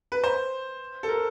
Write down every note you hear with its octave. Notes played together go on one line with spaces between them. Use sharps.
B4
C5
A4
A#4